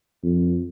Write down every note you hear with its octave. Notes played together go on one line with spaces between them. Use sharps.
F2